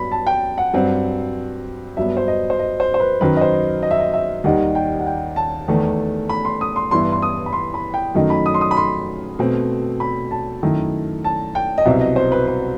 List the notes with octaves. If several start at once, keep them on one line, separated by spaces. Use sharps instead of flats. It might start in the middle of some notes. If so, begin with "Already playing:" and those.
Already playing: G2 F#3 B3 B5
A5
G5
F#5
G2 F#3 C4
G2 F#3 B3 E5
C5
D#5
C5
D#5
C5
C5
B4
F#2 D#3 F#3 B4
D#5
C5
D#5
E5
D#5
E5
D#2 D#3 G3 D#4 F#5
G5
F#5
G5
A5
E2 D#3 A3
B5
C6
D#6
C6
G2 E3 B3 E4 C6
C6
D#6
B5
C6
B5
G5
F#2 D#3 F#3 A3 D#4
B5
D#6
C6
D#6
B5
C6
B2 A3 C4
B5
A5
F#2 D#3 A3 E4
A5
G5
D#5
C2 B2 F#3 C4 E5
D#5
C5
B4
B4